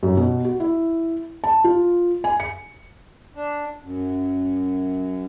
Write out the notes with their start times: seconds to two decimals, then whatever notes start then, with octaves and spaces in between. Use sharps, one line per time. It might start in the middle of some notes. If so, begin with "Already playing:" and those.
0.03 F#2
0.17 B2
0.45 F#4
0.60 E4
1.44 A5
1.64 F4
2.24 G#5
2.40 C#7
3.35 D4
3.84 F#2